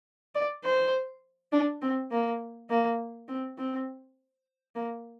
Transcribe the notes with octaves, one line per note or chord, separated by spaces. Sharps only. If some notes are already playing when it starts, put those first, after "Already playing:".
D5
C5
D4
C4
A#3
A#3
C4
C4
A#3